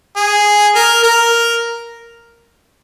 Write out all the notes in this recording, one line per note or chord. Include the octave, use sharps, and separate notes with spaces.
G#4
A#4
A#4